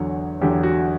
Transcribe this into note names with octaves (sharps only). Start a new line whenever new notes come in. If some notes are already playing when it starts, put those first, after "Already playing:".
Already playing: E2 D3 F#3 C#5
E2 D3 F#3 G4
F#4